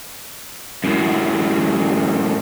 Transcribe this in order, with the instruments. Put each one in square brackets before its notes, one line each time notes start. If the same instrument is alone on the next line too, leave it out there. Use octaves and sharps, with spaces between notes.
[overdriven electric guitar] F#2 A2